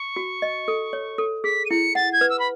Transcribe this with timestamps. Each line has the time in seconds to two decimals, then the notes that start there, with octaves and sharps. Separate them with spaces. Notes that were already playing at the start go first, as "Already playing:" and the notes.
Already playing: C#6
0.16 F#4
0.42 D#5
0.68 A4
0.93 C#5
1.18 A4
1.44 G#4 B6
1.65 D#7
1.70 E4 C#7
1.95 F#5 A6
2.13 G#6
2.21 B4
2.30 E6
2.39 B5